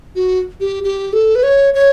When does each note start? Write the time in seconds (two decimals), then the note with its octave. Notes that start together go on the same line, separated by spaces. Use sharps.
0.15 F#4
0.60 G4
0.84 G4
1.13 A4
1.35 B4
1.43 C#5
1.74 C#5